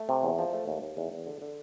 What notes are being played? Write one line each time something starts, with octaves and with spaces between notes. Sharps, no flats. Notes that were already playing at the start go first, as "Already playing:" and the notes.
Already playing: A3
C3
E2
F3
A3
D#2
D#2
E2
E2
D3
D3